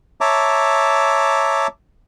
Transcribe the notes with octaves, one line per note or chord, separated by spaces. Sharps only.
C#5 E5 A5 A#5 D6